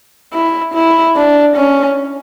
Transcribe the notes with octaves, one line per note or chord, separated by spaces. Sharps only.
E4
E4
D4
C#4